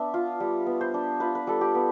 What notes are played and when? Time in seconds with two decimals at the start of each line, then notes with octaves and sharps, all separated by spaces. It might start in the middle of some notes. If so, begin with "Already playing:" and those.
Already playing: B3 D4 E5
0.14 F4
0.40 G3
0.66 B3
0.81 C5
0.94 D4
1.20 F4 B4
1.35 B4
1.47 G3 A4
1.61 G4
1.75 B3